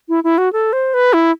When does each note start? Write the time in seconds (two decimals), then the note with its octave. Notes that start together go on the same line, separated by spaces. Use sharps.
0.09 E4
0.24 E4
0.38 F#4
0.53 A4
0.73 C5
0.94 B4
1.13 E4